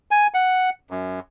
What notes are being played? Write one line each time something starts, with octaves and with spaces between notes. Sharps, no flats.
G#5
F#5
F#2